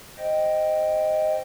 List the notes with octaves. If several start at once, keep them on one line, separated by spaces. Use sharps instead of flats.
C5 D#5 G5